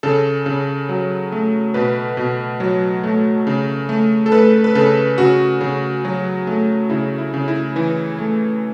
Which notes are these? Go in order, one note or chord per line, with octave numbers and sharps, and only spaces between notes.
C#3 A4
C#3
F#3
A3
B2 B4
B2
F#3
A3
C#3
A3
A4
A3 B4
B4
C#3 A4
C#3 F#4
C#3
F#3
A3
C#3 E4
E4
C#3
E4
E3 E4
A3